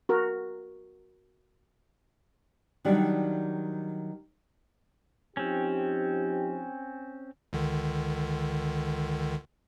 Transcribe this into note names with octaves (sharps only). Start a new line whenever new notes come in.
F#4 A#4
D#3 F#3 G3 D4
F3 C4 C#4 D#4 G4
C#2 D3 D#3